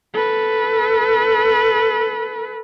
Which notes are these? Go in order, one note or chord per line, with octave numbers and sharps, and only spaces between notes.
A4 B4